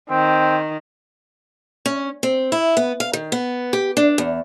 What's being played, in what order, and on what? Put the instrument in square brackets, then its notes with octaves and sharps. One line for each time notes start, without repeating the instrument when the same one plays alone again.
[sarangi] D#3 [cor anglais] C4
[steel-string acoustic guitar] C#4
C4
E4
B3
F5
D#3
B3
G4
D4
E2